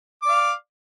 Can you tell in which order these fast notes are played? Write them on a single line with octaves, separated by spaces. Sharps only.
D6 D5 F5